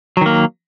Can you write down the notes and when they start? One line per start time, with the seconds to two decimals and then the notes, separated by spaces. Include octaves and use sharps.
0.17 F#3
0.21 D#3
0.26 A#3